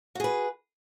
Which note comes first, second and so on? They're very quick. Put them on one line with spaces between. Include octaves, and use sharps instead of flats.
F#4 G#4 B4